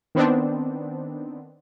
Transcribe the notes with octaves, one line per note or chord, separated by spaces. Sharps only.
D#3 B3 C4 D4